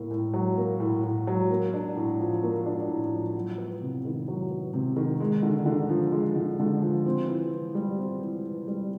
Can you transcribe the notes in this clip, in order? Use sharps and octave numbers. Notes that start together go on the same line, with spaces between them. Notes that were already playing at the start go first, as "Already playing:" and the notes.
Already playing: A2 A#3
A2
F#3
A#3
A2
A2
F#3
A#3
D4
A2
F3
A#3
D4
A2
F3
F#3
B3
C3
D#3
F#3
B3
C3
D#3
G#3
D3
D3
F3
G#3
D3
D3
F3
C4
E3
E3
G3
C4
E3
E3
G3